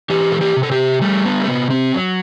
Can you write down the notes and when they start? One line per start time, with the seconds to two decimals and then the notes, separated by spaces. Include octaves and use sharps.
0.10 E3 G4
0.32 A4
0.41 G4
0.56 C3
0.63 A4
0.72 G4
1.02 G3 A3
1.25 B3
1.41 A3
1.47 C3 B3
1.70 C4
1.94 F#3